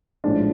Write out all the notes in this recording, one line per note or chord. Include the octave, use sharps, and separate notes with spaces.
A#1 A2 F3 G#3 D4